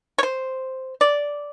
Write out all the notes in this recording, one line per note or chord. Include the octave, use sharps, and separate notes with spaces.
C#5
C5
D5